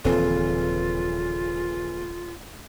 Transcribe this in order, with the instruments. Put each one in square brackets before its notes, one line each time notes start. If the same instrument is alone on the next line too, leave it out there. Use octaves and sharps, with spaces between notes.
[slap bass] D#1 C4 [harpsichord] A#1 C#3 E3 [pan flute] F4 [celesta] A4